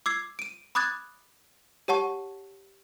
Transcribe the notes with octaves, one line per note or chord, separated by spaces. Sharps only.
D6 E6 G#6 C7
D7 D#7
B5 D6 D#6 F#6 G#6 A6
G4 C#5 F#5 A5 C#6